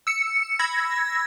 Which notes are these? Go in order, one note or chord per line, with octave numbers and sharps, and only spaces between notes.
E6 C#7
B5 E6 G#6 A#6